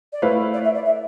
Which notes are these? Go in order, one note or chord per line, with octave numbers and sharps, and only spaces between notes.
D5
A3 E4 B4 C5 F5
D5
E5
D5
E5